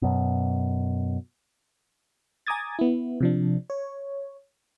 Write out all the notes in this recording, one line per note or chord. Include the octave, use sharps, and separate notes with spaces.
F#2 B2
G#5 A#5 D6 D#6 G#6 A6
B3 E4
C3 F3 D4
C#5